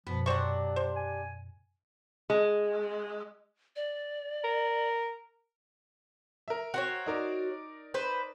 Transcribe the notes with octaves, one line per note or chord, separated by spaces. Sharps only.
F#2 B2 F3 B3
C3 F#3 D4 C5 F#5 C#6
C5
G#5
G#3
D5
A#4
A#4 E5
F#4 C5 C#5
D#4 A#4 D5
B4 C5